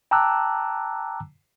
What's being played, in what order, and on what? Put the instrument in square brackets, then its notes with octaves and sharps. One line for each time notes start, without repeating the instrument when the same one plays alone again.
[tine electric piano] G5 A5 A#5 D6 E6 F#6